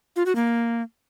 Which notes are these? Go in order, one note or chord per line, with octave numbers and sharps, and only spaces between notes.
F4
F#4
A#3